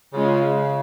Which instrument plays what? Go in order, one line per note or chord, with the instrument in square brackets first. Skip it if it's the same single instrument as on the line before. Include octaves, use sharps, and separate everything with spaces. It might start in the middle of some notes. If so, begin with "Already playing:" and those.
[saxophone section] C#3 [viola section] G#3 C#4 F4